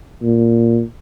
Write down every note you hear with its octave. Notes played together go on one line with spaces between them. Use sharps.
A#2